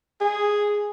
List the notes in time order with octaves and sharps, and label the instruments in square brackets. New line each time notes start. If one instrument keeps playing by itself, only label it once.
[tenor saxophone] G#4